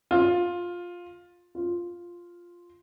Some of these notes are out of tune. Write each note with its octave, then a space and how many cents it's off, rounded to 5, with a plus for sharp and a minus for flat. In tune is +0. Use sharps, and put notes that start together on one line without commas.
F4 +10
F4 +0